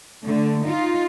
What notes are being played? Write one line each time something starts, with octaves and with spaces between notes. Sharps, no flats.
D3 A3
D#4 F4